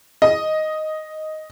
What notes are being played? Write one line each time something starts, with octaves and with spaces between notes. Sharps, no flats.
D#5